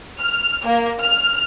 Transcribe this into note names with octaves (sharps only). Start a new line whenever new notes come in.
F6
A#3
F6